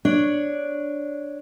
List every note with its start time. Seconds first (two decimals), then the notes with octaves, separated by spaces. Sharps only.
0.05 D4 C#5